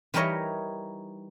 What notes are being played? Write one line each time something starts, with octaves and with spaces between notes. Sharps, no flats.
E3 G3 D#4 A#4 C#5 D#5